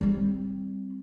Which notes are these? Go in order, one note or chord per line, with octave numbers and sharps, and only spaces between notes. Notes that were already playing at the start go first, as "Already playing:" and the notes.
G3 C4